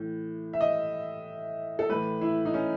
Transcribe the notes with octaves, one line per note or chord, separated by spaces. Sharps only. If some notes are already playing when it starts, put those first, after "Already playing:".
Already playing: A2 E3
E5
D#5
A4
A2 E3 B4
E4
D#4
C#4